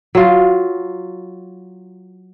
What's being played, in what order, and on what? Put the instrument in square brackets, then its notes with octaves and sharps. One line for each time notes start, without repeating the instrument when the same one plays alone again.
[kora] F#3 F4